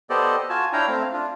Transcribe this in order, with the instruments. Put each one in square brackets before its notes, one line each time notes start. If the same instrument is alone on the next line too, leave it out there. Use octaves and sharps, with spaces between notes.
[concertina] B3 G4 A4 C5 D5 D#5
F4 F#4 G#5 A5
D4 E4 C#5 F5 G5 A#5
A3 C4 F5
D4 F4